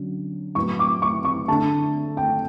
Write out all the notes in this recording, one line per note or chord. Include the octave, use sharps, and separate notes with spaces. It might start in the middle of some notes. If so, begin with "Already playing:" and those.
Already playing: D3 F#3 C#4
A2 F#3 B3 C#6
D6
C#6
C#6
D3 A3 D4 A5
G5